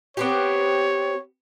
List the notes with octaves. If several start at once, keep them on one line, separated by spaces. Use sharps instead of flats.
B3 C4 G4 C#5